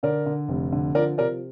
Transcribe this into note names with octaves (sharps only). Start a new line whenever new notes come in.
D3 A#4 D5
D3
F1
D3
F3 A#4 D5
C3 A#4 D5